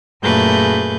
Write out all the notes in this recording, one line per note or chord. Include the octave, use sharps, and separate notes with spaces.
F#2 A#2 A3 G#4 B4 G6